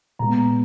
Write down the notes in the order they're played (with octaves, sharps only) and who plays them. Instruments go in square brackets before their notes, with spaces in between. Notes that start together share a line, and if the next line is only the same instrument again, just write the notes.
[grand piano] A#2 G#3 B3 A#5